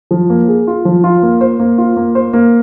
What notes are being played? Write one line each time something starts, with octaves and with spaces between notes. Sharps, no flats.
F3
A#3
G#4
F4
F3
F4
A#3
C5
A#3
F4
A#3
C5
A#3